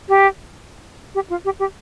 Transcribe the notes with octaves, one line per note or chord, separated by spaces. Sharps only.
G4
G4
F4
G4
G4